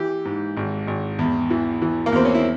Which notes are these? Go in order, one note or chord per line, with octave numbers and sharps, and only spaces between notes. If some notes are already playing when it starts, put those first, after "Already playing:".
Already playing: E3 G4
G#2
G#1
G#1
E2
E3
E3
A#3
E2 C4
C#4
E4